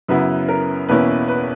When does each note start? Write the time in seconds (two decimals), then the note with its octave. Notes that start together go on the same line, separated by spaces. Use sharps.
0.08 F#2 C#3 F#3 B3 E4 B4
0.49 A#4
0.89 E2 B2 A#3 C#4 E4 B4
1.28 B4